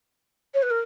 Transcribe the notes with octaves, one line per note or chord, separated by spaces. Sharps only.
C#5
B4
A#4